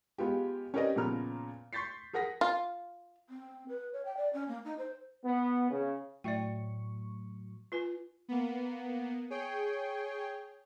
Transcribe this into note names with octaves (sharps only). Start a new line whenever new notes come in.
G#3 B3 F4 G4
C#4 G4 A#4 B4 D5 D#5
A#2 C#3 F3 B3 A#5 F6
C6 C#6 G6 A6 B6 C7
G#4 A#4 F#5 D#6 A#6 B6
F4
C4
B4
C#5
G5
D5
C#4
A#3
D#4
C5
B3
C#3
A2 F#3 D5 E5 G5 C#6
F4 B4 G#5
A#3 B3
G#4 C#5 G5